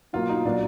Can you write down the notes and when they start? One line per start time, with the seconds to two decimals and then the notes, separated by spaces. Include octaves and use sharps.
0.13 B2 F#3 A#3 F4
0.29 D#4
0.44 A#2 F#3 A#3 D4